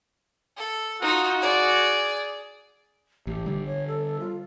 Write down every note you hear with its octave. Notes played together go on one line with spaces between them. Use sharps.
A4
D#4 F4 F#4
G#4 D5
A1 G4
D3 G3
C#5
A4
F4